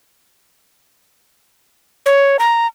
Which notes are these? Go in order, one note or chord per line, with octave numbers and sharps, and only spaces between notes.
C#5
A#5